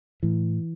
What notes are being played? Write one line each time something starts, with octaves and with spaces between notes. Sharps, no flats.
A2 E3